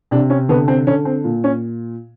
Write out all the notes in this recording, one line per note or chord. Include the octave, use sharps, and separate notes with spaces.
C3 D4
C#4
D3 B3
C4
D3 C#4
C4
A#2
C#4